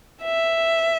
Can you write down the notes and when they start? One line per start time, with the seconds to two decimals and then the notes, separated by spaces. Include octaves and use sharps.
0.23 E5